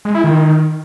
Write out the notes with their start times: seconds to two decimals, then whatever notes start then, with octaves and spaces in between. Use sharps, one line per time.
0.05 G#3
0.15 E4
0.24 D#3